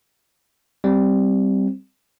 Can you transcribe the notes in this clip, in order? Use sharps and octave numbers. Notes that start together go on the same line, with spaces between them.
G3 C4